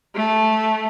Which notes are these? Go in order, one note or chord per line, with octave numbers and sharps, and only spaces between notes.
A3